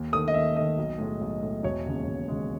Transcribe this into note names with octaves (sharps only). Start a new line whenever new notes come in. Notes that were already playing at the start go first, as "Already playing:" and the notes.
Already playing: D#2
D#3 A3 D#6
D#5
D#2 E5
D#3 A3 D#5
B1
A2 G#3
B1
A2 G#3
E1 C#5
D#2 C#3 G#3
E1
D#2 C#3 G#3